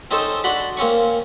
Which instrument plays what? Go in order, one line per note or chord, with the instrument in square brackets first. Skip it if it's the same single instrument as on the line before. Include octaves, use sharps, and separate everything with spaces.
[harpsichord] C4 C#4 D#4 A4 C5
D4 F#4 B5 C6
A#3 C4 C#4 C#6